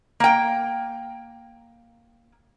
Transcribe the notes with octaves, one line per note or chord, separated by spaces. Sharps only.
A#3 G5